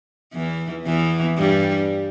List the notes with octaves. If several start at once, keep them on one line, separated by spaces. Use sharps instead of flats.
E2 E3
E2 E3
G2 G3